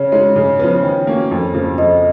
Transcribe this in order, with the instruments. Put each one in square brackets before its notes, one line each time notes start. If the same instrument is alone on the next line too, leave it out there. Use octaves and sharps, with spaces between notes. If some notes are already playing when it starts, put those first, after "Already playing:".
Already playing: [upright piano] C#3 [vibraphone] C#5
[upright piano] G#3 D#4
C#3
F3 B3
D#3
A#3 C#4
F2
C#3 F3 A#3
[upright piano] F2 [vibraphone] D#5